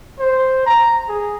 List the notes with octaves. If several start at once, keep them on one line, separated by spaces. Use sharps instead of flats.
C5
A#5
G#4